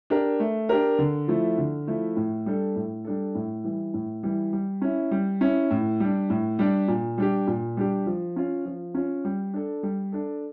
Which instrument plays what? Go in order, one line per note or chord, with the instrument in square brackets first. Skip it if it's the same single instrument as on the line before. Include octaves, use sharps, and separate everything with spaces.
[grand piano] D4 G4 A#4
A3
D4 G4 A#4
D3
F3 A3 E4
D3
F3 A3 E4
A2
G3 D4 A4
A2
G3 D4 A4
A2
E3 G3
A2
E3 G3
G3
C#4 E4
G3
C#4 E4
A2
G3 D4
A2
G3 D4
A#2
G3 D4 G4
A#2
G3 D4 G4
F3
C#4 F4
F3
C#4 F4
G3
D4 A4
G3
D4 A4